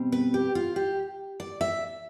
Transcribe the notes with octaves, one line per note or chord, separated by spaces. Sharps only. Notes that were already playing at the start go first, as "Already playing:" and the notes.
Already playing: B2 G3 C4
B4
G4
F4
G4
D5
E5